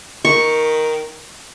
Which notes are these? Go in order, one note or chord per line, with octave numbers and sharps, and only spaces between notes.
D#3 C#6